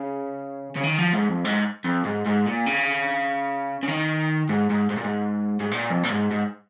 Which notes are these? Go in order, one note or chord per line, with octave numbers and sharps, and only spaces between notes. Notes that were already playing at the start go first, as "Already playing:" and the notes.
Already playing: C#3
C#3
D#3
F3
G#2
F2
G#2
F2
G#2
G#2
A#2
C#3
C#3
D#3
G#2
G#2
G#2
A#2
G#2
G#2
A#2
F2
A#2
G#2
G#2